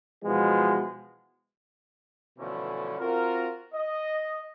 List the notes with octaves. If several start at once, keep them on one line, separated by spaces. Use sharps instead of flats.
B2 E3 F3 G#3 B3
B2 D3 E3 F3 A3 C#4
C4 F4 F#4 A#4
D#5